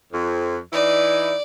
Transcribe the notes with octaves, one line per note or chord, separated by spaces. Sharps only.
F2
E3 D#4 E4 D5